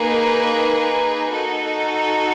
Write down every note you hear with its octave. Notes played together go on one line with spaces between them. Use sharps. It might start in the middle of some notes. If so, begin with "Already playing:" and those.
Already playing: A#3 D#4 G#4 B4
D#4 F#4 A4